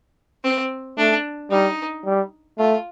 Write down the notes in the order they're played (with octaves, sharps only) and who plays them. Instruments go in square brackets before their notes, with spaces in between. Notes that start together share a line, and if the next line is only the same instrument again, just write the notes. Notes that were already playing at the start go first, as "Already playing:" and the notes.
[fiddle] C4
[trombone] A3 [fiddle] D4
[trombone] G3 [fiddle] D#4
[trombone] G3
[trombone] A3 [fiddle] F4